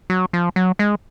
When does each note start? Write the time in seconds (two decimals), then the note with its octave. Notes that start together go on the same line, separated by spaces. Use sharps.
0.10 F#3
0.33 F3
0.56 F#3
0.79 G#3